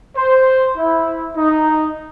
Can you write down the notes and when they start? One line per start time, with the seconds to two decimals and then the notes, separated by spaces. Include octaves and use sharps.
0.17 C5
0.76 E4
1.36 D#4